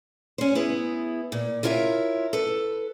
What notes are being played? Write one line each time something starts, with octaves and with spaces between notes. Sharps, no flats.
C#4 C5
B3 E4 G#4
A#2
E4 F4 A#4 C#5 D5 E5
A4 B4